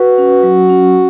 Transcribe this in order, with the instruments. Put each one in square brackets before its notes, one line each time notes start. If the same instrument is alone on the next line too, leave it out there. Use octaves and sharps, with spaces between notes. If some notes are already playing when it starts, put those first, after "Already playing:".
Already playing: [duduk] F#4 [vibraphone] B4
[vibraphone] C#4
F#3
C#4